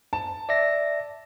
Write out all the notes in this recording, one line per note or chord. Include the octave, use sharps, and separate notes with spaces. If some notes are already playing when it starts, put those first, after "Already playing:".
A5
D5 E5 A#6